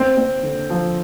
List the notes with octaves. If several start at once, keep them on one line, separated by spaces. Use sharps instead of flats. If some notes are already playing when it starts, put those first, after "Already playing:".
Already playing: C4
C4
D3
F3